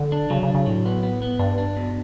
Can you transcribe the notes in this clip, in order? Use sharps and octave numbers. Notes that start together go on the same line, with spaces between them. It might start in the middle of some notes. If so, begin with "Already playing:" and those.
Already playing: D3
D4
C#3 F#3
C#3
D4
C#3
A2 F#3
B3
B3
B3
G2 D4
D4
B2